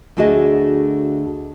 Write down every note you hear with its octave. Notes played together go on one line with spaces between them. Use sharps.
D2 A3 D4 F#4 G#4 D#5